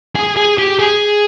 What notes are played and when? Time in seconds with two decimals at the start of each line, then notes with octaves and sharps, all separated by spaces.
0.16 G#4
0.37 G#4
0.58 G4
0.79 G#4